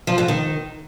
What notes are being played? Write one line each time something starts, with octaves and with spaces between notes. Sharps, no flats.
F3
G#2
D#3